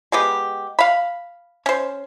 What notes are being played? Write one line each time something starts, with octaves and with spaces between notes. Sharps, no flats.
G#3 B3 G4
F5 B5
C#4 C5